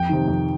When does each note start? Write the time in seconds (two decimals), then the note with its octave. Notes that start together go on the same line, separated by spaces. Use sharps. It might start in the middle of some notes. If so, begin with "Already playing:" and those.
Already playing: F2 G5
0.09 C3 D#3
0.28 F2